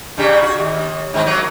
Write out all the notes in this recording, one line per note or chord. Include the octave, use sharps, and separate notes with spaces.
G2 C#3 G3
F#4
D#2
G#2 D#3 C4
F#3 A#3